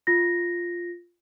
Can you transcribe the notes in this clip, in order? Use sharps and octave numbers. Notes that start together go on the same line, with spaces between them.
F4 A#6